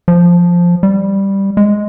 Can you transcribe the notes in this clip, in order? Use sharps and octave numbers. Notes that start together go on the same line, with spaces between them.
F3
G3
G#3